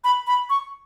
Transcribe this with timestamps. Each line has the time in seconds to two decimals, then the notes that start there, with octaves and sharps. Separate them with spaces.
0.04 B5
0.27 B5
0.50 C#6